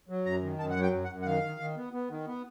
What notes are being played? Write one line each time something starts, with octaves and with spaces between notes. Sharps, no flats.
F#3
F#2 A#5
D#3
F#2 A5
F#5
F#3
G5
F#2
F#5
F#2
F#5
D#3 F5
D#3
D#3
B3
B3
D#3
B3